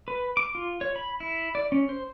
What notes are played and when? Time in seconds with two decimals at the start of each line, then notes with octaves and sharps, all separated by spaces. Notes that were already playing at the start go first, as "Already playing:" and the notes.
0.08 B4
0.37 D6
0.55 F4
0.81 C#5
0.96 B5
1.20 E4
1.55 D5
1.72 C#4
1.89 C5